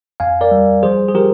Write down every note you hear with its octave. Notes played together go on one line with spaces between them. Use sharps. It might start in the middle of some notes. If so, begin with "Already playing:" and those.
F2 F5 G#5
A#4 D5
G3
F3 G#4 C5
G#4
F3 G4 A#4